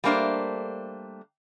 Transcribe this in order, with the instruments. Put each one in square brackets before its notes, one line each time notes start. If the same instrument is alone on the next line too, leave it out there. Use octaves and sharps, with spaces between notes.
[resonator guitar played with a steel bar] G3 A3 A#3 D4 C5